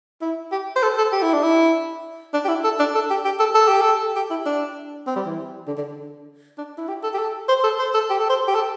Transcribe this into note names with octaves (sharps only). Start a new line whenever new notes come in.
E4
G4
C5
A4
A4
G4
E4
D4
E4
D4
G4
E4
A4
D4
A4
G4
G4
A4
A4
G4
A4
G4
E4
D4
C4
G3
E3
D3
D3
D4
E4
G4
A4
G4
A4
C5
A4
C5
A4
G4
A4
C5
G4
A4